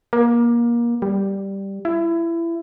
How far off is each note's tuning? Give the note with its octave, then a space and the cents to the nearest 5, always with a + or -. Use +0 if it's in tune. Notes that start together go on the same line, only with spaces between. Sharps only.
A#3 +25
G3 +0
E4 +25